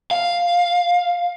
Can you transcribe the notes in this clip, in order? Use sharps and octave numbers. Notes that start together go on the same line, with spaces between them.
F5